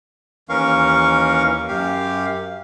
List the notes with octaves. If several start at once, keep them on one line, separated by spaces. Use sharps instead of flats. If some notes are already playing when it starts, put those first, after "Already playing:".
D#2 E3 C#4 A#4 F5 C#6
F#2 G4 F5